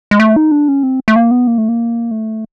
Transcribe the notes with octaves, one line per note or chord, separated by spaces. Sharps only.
G#3
A3
D#4
D4
C#4
C4
A3
A#3
B3
A#3
A3
A#3
A3